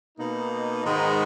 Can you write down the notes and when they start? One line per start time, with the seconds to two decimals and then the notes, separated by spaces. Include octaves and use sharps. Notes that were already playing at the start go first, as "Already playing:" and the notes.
0.18 B2 A#3 D#4
0.84 G#2 D#3 G#3 B3 D#4